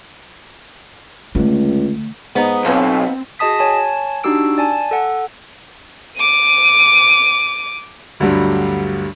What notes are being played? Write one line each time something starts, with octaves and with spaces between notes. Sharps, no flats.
C#2 D3 A3
G#2 B3 D#4
B1 C4 F4 B4
F#4 G#4 D#5 A5 D#6 B6
C#5 G#5 A5
D4 D#4 F#4 G4 E6 D7
D5 G#5 A5
A4 F#5
D6 D#7
D2 G2 D3 F#3 G3